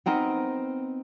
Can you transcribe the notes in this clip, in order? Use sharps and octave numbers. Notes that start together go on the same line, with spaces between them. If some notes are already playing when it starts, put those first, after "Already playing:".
B3 C4 D#4 A#4